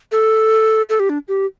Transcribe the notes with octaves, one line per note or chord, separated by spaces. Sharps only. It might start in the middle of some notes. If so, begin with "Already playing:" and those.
A4
A4
G4
D4
G4